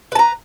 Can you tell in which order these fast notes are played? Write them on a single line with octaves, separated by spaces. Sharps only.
B4 A5 A#5